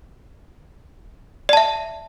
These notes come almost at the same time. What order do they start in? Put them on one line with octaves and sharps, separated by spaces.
D5 A5 E5